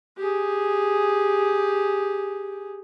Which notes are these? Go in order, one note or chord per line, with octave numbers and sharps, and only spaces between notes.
G4 G#4